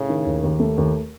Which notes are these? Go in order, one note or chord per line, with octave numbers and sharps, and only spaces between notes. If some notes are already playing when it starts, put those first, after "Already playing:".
Already playing: A2 C#3
D#3
D#2
D#2
A3
D#2